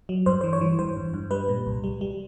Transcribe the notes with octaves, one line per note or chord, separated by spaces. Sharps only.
F#3
G2 C5
E3 C5
C#5
E3
G2 C5
G2
G2
G3 B4
A#2
C2
G3
G3